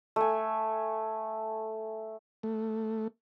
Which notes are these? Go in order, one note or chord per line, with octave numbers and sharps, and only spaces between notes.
A3 G#5
A3